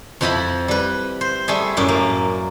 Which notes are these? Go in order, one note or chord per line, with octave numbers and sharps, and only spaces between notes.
F2 F3 E4 D#5 A5 B5
G3 B4
C5
G3 A3 G#4 E5
F#2 A2 D5
A#3